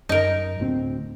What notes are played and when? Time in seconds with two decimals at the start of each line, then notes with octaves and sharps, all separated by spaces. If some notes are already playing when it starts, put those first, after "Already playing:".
0.09 F#2 D#4 A#4
0.60 D2 A2 C4